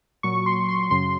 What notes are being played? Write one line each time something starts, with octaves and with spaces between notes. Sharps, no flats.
A#2 F#3 C#6
C6
C6
F#2 C#3 F#3 C6